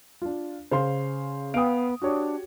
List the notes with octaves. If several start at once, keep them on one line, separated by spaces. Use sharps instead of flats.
D4 F4
C#3 C5 F5 C6
B3 F5 G5 D#6 D7
D4 F#4 G4 C#5